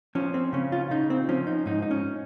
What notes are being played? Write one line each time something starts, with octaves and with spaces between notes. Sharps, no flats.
F3 C#4
C4
C#3 C#4
F4
C#3 D#4
C4
F3 C#4
D#4
G#2 D#4
D#4
C#4